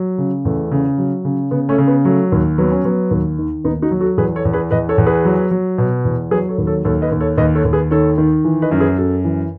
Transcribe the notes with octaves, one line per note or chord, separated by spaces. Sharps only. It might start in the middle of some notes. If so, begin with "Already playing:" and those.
Already playing: F#3
C#3
E2 A3
C#3
F#3
C#3
C#3 B3
A3 C#4
C#3
B3
F#3 A3
D#2
F#3 B3
C#4
F#3 B3
D#2
D#3
D#2 B3 D#4
D#4 F#4
F#3
F#4 A4
E2 G#4 B4
A4 C#5
E2
G#4 B4
E2 B4 D#5
A4 C#5
E2
G#4 B4
F#3
F#3
B2
E2
F#3 G#4 B4
A4 C#5
D#2
A4 C#5
D#2 A4 C#5
B4 D#5
D#2
A4 C#5
D#2 B4 D#5
A4 C#5
D#2
G#4 B4
D#3 A4 C#5
D#3
E3
B4 D#5
F#2
G#4 B4
F#2 F#4 A4
E3